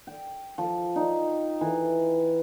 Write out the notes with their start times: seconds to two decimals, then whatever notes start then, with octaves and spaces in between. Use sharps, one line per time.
0.07 G5
0.58 F3
0.96 D#4
1.61 E3